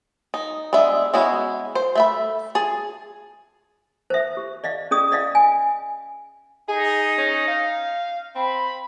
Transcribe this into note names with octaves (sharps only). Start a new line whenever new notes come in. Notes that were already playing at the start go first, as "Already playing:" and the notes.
D#4
G#3 B3 D4 E5
G#3 B3 C#4 E4 F#4
C5
A3 E5 B5
G#4 A5
C5 E5
G4
D5 D#5 F5
C#4 G#4 D5 D#6
D5 D#5 F5
G#5
D#4 G#4
C#4
F5
C4 B5